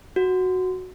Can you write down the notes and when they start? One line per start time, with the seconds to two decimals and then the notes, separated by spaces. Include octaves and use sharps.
0.16 F#4